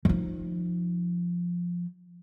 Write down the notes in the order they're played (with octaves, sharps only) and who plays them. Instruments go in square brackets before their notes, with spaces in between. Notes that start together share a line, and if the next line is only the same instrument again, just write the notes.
[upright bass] F3 D#4